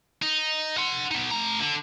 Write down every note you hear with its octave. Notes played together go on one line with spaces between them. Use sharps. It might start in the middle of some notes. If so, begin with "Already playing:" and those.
D#4
F#5 C6
B3 D#4
A3 A#5
D3